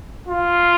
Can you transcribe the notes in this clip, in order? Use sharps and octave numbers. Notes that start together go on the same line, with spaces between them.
F4